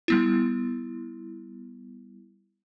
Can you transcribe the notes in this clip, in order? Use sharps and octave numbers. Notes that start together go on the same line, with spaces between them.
G3 B3 E4